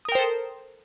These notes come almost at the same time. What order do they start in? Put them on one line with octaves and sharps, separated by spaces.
D#6 A#4 G5 C5 A4